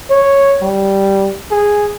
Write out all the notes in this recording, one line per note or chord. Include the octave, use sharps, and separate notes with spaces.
C#5
G3
G#4